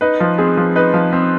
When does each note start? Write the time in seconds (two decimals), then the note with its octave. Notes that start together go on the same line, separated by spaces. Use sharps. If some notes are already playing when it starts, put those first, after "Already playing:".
0.01 D#4 B4
0.20 F3
0.38 C4 G#4
0.57 F3
0.76 D#4 B4
0.94 F3
1.13 C4